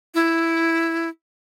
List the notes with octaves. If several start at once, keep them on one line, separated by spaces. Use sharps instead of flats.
E4